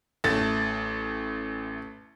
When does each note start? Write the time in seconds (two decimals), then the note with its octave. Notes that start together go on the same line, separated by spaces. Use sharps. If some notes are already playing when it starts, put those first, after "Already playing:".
0.24 A1 A3 A4 A6